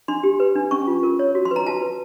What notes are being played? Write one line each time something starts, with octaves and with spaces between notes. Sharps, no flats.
D4 C6
G4
B4
D4
C#4 C#6
F4
A#4
C#5
F#4
C6
B4
A#5
F#4 A5
B4